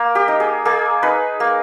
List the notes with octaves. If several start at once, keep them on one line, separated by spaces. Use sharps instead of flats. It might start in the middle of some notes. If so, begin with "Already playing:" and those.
Already playing: A#3 A#4
G4
D#4
G#4
A#3 G#4
D#4 B4
A#3